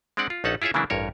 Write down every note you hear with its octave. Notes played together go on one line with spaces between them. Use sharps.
G#3 C4 D4 D5 F#5
F4
A#1 C#4 D#4 A4 F#5
E4 F4 G#4 C#5 E5
C#3 E3 F#3 A#3 D4 E4
A1 G2 A#4 C#5